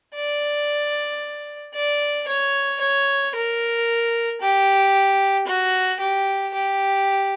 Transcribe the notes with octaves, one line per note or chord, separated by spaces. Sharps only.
D5
D5
C#5
C#5
A#4
G4
F#4
G4
G4